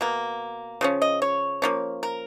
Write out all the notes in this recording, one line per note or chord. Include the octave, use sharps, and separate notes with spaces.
B2 A#3
C#3 F3 C#4
D#5
C#5
F3 A#3 C#4
A#4